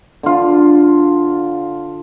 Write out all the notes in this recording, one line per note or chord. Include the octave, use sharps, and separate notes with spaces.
D3 F4